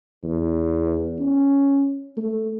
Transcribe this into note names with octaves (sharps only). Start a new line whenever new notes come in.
E2
C#4
A3